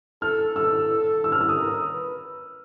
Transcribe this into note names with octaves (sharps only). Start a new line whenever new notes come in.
A4 F6
A4 E6
E6
F6
E6
D#6
A#4
B4